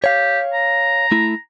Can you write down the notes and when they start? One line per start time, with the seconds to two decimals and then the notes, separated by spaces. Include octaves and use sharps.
0.04 G4 C#5 F5
0.53 A#5
1.12 A3 E4